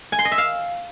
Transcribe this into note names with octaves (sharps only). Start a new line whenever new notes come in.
G#5
C6
D#5
E5
F5